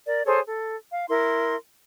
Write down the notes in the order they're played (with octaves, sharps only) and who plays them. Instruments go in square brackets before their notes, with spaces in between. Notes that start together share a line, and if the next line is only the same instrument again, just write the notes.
[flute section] A#4 D5
G#4 A4 C5 C#5
A4
F5
E4 A#4 C6